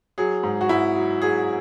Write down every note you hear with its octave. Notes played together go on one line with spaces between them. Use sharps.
F#3 G#4
G#2
F#4
G#2 E4
F#3
F#3 G#4